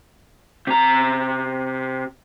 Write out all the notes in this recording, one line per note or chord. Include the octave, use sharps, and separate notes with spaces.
C3 A#5